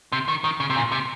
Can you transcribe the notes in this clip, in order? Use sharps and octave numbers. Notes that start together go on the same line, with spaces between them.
C3
D#3
D#3
C#3
C3
A#2
C3